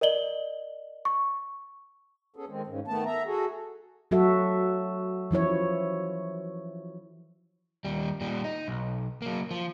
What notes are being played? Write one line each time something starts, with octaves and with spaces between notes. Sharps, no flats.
A#4 D5 D#5 F#7 G7
C#6
B3 C#4 G#4 A4
D#3 G#3 C4
G#2 C#3
D#3 A3 B3 A5
E5 A#5
F#4 G#4 A4
F#3 F#4 A4 E5
E3 F3 E4 C#5
D#2 G3
A#2 G3
D#4
B1
F#3 A#3
F3